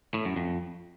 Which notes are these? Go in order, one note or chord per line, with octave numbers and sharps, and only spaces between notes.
A2
F#2
F2